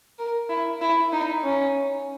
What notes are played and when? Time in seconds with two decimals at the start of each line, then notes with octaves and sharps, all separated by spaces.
0.19 A#4
0.49 E4
0.81 E4
1.13 D#4
1.44 C#4